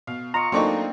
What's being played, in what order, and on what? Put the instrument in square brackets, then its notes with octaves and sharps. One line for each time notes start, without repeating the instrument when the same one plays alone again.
[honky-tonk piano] B2 [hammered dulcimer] F5
[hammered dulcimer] F4 D#5 C#6 [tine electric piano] A#5
[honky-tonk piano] F#3 A3 D#4 [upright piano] A#3 D4 C#6 [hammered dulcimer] C4